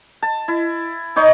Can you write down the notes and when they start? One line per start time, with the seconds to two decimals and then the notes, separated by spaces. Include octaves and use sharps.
0.22 A5
0.48 E4
1.16 D#4 C#5 D#5 C6